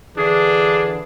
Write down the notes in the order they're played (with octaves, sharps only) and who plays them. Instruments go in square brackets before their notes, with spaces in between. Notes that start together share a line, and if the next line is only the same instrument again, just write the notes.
[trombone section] D3 E3 [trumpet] D4 [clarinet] G#4